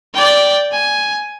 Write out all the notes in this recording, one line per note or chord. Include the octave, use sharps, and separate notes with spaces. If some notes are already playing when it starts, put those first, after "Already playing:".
D5 G5
G#5